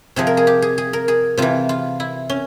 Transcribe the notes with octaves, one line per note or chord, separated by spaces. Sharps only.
C3 F3 G#4
A#4
G#4
G4
G#4
G#4
A#4
G#4
C3 E3 F4
F4
E4
C#4